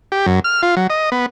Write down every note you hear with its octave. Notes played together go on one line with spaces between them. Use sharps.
G4
F#2
F6
F4
F#3
D#5
B3